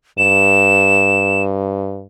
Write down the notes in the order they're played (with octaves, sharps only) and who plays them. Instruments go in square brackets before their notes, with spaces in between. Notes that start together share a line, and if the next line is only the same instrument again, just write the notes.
[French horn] G2 [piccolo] E7